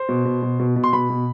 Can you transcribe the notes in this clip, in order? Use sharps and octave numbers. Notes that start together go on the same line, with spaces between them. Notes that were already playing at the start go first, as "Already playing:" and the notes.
Already playing: C5
B2
B2
B2
B2
B2
C6
B2 B5
B2